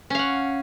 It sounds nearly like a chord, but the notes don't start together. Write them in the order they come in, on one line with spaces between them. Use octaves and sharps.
C#4 F5 F#5